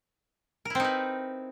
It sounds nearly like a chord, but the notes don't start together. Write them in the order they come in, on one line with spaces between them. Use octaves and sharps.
A#4 E4 C4 D#4 B4